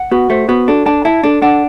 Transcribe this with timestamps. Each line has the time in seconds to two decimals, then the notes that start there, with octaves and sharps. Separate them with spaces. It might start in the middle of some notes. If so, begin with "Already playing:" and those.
Already playing: F#5
0.11 B3 F#4
0.30 A3 C5
0.48 B3 F#4
0.68 D4 A4
0.86 D4 A5
1.05 E4 A5
1.23 D4 A4
1.42 D4 F#5